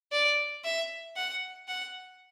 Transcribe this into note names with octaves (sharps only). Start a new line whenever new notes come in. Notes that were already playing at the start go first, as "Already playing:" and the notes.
D5
E5
F#5
F#5